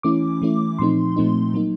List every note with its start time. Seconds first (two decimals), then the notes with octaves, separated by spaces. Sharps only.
0.03 E3 A3 C#4 E4 D6
0.42 E3 A3 C#4 E4
0.79 A#2 F3 A3 C4 D#4 C6
1.16 A#2 F3 A3 C4 D#4
1.54 F#3 A#3 D#4